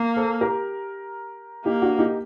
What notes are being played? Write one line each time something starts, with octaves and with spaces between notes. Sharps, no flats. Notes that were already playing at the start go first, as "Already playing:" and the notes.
Already playing: A#3
A4 C5
G4 A#4
A#3 D#4 G4
D4 F#4
D#4 G4